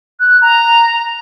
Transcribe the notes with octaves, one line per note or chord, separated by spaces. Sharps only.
F#6
A#5